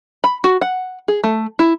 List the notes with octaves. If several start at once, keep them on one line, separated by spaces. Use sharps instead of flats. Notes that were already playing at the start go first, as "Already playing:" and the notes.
B5
F#4
F#5
G#4
A3
E4